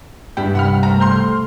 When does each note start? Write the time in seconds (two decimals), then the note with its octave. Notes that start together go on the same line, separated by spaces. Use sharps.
0.37 G2 G3 E4 G5
0.55 C2 F#5 B5 F6
0.83 A3 C4 A#5
1.00 C6 F6 G6